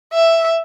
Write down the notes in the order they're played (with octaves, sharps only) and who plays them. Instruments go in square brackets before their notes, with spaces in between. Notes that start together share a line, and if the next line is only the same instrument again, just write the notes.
[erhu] E5